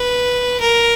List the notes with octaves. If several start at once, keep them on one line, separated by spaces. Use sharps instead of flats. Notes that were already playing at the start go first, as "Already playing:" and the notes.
Already playing: B4
A#4